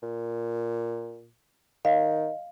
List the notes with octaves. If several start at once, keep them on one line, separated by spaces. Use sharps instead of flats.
A#2
D#3 D#5 F5